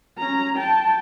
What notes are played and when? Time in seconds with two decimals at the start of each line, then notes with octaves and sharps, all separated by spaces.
0.18 C#4 A#5
0.57 G5 A5